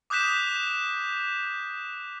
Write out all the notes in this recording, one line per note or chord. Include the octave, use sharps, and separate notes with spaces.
D6 D#6 F#6 G6 B6 E7